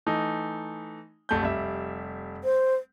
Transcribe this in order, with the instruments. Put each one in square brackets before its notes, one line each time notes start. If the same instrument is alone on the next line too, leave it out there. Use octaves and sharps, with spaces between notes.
[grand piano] E3 A3 D#4
F1 A3 G6
F1 G3 E5
[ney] C5